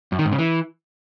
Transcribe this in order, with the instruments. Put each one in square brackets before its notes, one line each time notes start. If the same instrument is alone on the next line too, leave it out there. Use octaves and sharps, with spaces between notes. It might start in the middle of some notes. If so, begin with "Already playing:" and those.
[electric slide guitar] F#2
D#3
G#2
C#3
E3